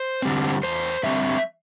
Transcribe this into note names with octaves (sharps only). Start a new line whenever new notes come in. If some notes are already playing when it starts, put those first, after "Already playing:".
Already playing: C5
D3 G3 C4
E2 C5
D3 G3 C4 E5